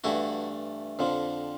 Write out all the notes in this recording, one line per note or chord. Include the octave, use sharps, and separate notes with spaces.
G2 E3 A3 E4 F#4
F2 D3 F3